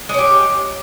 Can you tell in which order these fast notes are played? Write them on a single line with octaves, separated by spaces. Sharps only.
G#3 C#4 G4